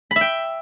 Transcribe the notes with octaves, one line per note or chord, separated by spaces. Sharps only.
E5 G5 B5